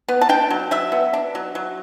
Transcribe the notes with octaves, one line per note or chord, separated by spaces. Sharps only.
B3
A5
D4 G5
F#3
F#3 E5
B3
D4
F#3
F#3